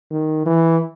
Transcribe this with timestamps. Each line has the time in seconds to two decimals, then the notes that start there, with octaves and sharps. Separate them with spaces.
0.11 D#3
0.46 E3